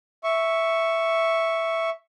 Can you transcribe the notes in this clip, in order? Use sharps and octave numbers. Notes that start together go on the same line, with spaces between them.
E5 C#6